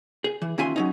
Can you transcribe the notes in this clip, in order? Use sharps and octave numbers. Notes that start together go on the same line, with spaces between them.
G#4
E3
D#2 C#4 F4 E5 G#5 C6
F#3 C#4 D#4